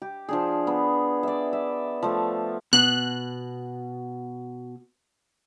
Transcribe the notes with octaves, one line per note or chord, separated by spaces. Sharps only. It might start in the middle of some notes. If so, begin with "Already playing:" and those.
G4
F3 D4 G#4
B3
D5 E5
E5
F3 A3
B2 F#6